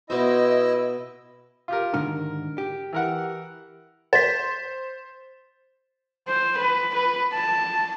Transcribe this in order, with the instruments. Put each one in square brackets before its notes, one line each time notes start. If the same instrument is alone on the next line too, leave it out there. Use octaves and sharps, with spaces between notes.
[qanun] B2 F#4 C5 [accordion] E4 D#5 E6
[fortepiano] F4 G4 A#4
[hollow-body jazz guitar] G#2 D3 D#3 [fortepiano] A#4 F6
[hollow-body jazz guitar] G4
[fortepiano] E3 A#4 F#5
[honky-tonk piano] C5 [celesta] A6 B6
[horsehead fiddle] C5
B4
B4
A5